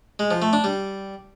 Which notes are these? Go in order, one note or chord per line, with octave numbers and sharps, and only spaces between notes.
G#3
F3
A3
D4
G3